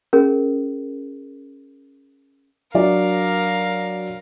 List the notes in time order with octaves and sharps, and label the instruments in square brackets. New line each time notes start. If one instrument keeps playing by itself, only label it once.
[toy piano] C#4 G#4 A#4
[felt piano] F#3 D4 D5 [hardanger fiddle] A#4 F5